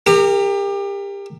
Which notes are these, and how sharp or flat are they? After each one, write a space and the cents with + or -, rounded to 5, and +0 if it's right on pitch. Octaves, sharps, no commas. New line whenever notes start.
G4 +30 A#4 -20